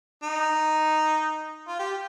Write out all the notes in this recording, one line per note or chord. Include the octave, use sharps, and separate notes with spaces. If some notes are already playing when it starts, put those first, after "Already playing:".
D#4
F4
G4